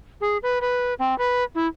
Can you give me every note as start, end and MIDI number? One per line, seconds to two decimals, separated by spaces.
0.21 0.37 68
0.43 0.59 71
0.61 0.94 71
0.99 1.17 60
1.18 1.43 71
1.55 1.67 64